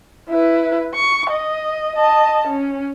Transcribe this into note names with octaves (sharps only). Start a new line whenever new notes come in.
E4 B4
C#6
D#5
D#5 A5
C#4